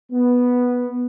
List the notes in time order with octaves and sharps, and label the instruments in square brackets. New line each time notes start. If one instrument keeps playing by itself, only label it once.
[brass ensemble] B3